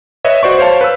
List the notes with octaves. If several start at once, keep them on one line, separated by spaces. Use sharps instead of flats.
B4 C#5 D#5 E5
F#4 C5 D5 C#6
C5 C#5 F5 A5
B4 E6